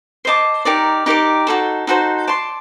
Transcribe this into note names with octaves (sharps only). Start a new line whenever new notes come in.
C5 D#5 A5 D6
D#4 G4 A#4 D5
D#4 G4 A#4 D5
D#4 F#4 A4 C5
D#4 F#4 A4 C5
D5 A5 C6